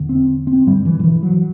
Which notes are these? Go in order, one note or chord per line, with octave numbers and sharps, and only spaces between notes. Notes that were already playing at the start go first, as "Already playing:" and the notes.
Already playing: E2 D3
C4
C4
G2 D3 G3
E3
D3
E3
F#3